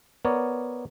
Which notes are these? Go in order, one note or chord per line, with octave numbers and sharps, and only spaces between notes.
B3 A#4 C#5 D5